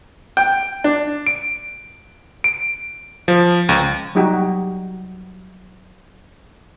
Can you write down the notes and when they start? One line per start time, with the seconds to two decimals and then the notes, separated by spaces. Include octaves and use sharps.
0.37 G5
0.84 D4
1.27 D7
2.44 D7
3.28 F3
3.69 C#2
4.15 F#3 G3 D#4 F#4 G4